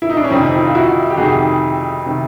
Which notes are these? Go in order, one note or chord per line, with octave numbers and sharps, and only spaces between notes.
E4
D#4
D4
C#4
F2 C3 D#3 C4
E4
F4
E4 F#4
G4
F2 C3 D#3 F#4 G#4
C3 D#3